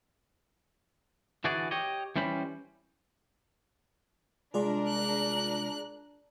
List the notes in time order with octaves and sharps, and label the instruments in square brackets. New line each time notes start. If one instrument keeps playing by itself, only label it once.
[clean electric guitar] D3 E3 F#4 G#4 D5
G4 C#5 D#5
E3 G3 C#4 C5 B5
[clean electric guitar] C2 G#3 C6 [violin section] D4 A#4 [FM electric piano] F4 G#4 D5
[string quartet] F#6